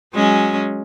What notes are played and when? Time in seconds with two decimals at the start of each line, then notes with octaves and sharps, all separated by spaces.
0.14 F#3 G#3 C#4